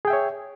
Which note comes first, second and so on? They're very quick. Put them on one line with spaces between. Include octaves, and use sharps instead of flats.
G#4 G5 E5 C#5